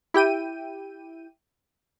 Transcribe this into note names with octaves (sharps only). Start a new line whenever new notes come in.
E4 G4 G5 D#7